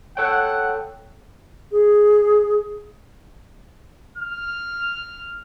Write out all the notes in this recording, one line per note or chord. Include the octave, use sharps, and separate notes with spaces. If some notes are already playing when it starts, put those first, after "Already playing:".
A4 C#5 F#5 G5
G#4
F6